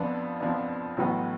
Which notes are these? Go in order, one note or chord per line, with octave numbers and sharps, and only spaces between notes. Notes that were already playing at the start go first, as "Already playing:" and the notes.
Already playing: F2 F3 B3 D4
F2 F3 B3 D4
A1 A2 F#3 B3 F#4